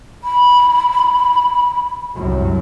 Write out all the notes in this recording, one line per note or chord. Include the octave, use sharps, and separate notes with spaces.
B5
C2 F#2